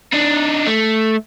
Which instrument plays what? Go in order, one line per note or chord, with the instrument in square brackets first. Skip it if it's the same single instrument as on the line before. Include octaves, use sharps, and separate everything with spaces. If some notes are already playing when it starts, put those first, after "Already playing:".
[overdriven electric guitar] D4 D#4
A3